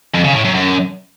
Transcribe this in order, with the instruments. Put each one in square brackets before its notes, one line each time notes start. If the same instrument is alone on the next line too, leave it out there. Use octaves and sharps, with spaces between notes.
[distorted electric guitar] F2
C#3
A2
F#2
F#2